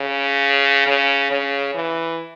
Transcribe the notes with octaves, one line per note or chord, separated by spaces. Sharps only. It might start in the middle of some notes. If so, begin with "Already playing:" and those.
Already playing: C#3
C#3
C#3
E3